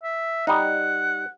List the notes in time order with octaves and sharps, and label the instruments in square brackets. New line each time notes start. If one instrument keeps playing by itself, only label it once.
[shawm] E5
[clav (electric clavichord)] G3 D#4 [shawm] F#5